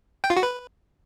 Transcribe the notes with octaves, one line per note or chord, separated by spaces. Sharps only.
G5
F4
F#4
B4